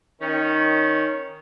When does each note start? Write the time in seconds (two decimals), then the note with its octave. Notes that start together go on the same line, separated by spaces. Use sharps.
0.21 D#3 C#4